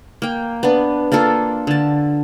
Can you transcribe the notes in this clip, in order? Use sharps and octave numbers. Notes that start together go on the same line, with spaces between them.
A#3 G5
B3 D4
A#3 D4 F4 A4
D3 A5